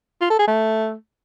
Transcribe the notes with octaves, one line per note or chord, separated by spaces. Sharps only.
F4
A4
G#4
A3